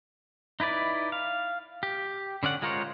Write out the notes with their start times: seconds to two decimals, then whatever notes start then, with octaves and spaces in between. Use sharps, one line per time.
0.60 D#4 E4 B4 D5
1.12 F5
1.83 G4
2.43 D3 C#4 D5 F#5
2.62 G#3 F4 A#4 C5 C#5